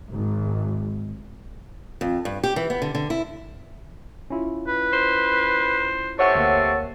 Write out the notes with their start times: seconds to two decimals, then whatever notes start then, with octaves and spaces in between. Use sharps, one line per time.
0.11 G#1
2.01 F2
2.25 G2
2.43 G4
2.56 E3
2.70 B3
2.82 D3
2.95 D3
3.10 E4
4.30 C#4 E4 F4
4.68 B4
4.93 C5
6.19 C3 A4 C#5 F#5 C#6
6.35 D2 A#3